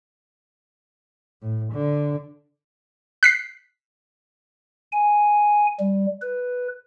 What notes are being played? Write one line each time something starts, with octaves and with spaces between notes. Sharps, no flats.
A2
D3
F#6 B6 C7
G#5
G3
B4